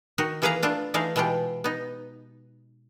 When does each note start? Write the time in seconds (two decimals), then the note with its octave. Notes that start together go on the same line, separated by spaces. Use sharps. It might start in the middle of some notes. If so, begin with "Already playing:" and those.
0.18 D#3 D#4 F#4
0.42 E3 A#3 G#4 B4 F5 A#5
0.63 A3 B3 D4 F4
0.94 E3 A3 D#4 G#4 F5
1.16 B2 E3 G#3 F4 G4
1.64 B3 D#4